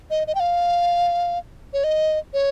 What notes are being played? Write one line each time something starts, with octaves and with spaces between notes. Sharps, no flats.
D#5
D#5
G5
F5
C#5
D#5
C#5